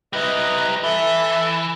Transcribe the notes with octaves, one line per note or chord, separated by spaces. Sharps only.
G3 E4 B4 D#5 A#5
E3 A4 E5